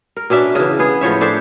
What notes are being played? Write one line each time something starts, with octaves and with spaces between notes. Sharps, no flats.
A#4
B2 C#4 D4 E5
C#3 E3
B3 G#4
A2 F3 C#5 E5
D4 A4 C5 E5